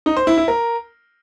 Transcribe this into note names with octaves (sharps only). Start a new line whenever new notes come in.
D#4
C5
E4
E4
A#4